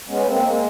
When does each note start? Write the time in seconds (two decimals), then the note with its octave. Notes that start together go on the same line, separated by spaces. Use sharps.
0.08 G#3 B3 C#4
0.26 G#3 A#3 C4
0.43 G#3 A#3